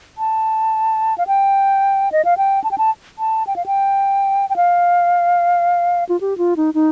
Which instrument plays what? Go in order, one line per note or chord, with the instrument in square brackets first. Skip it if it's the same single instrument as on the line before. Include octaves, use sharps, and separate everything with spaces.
[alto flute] A5
F5
G5
D#5
F5
G5
A5
G5
A5
A5
G5
F5
G5
G5
F5
F4
G4
F4
D#4
D#4